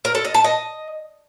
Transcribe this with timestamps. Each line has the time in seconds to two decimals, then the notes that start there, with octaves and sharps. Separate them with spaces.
0.05 A#4
0.15 A4
0.25 D#5
0.34 A5
0.44 D#5